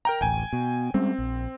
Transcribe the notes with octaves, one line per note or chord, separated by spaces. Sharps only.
A#4 G5 A#5
D1 A1 G5 G#5
B2
G3 G#3 C4 C#4
A#1